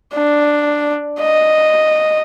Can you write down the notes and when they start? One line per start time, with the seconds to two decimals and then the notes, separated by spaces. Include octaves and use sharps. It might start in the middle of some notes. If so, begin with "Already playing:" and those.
0.14 D4
1.21 D#5